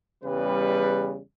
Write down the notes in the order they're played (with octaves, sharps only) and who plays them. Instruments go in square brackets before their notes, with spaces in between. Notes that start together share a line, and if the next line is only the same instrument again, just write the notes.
[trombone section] E2 C#3 G3 [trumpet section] B4